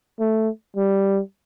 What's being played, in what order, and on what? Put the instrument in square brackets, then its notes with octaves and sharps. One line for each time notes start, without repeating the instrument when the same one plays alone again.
[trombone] A3
G3